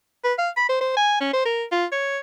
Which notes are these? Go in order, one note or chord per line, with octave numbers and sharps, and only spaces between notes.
B4
F5
B5
C5
C5
G#5
C#4
C5
A#4
F4
C#5